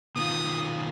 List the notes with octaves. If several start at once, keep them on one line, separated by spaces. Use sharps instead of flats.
B2 D#3 F4 D#6